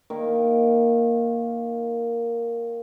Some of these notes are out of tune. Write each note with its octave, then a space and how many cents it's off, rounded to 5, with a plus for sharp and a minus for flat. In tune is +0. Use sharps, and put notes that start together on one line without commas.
D#3 +0 A#3 +0